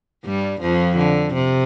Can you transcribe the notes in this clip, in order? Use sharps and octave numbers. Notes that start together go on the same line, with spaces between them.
G2 G3
F2 F3
D3
C3